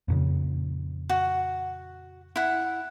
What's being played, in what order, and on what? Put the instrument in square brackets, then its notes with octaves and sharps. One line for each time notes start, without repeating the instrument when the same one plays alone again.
[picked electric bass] F2 A#2 C#3
[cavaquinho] F#4
E4 F#5